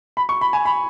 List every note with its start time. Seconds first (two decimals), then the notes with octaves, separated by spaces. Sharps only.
0.17 B5
0.29 C#6
0.41 B5
0.53 G#5
0.65 B5